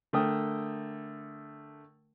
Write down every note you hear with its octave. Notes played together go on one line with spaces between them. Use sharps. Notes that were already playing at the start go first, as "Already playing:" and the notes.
D3 A3 A#4 G5 D#6